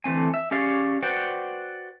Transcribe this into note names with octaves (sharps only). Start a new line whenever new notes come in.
D3 E3 A3 C4 G#5
E5
C#4 G4 G#4 C#5 D5 F5
F#4 B4 C5 D5 F#5 G5